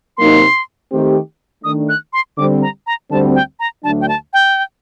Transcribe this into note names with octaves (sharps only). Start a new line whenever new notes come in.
C3 F#3 A#3 D#4 C6
D#3 A3 C4 G4
D#3 A3 D4 D#6
F#6
C6
D3 G3 C4 D6
A#5
A#5
D2 D3 G3 C4 A5
G5
A#5
D2 D3 F#3 A3 D4 A5
G5
A5
G5